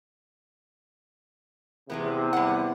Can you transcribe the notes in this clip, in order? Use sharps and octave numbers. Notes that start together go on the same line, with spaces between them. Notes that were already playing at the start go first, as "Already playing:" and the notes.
E2 A2 C3 G#3 B3
G3 F#5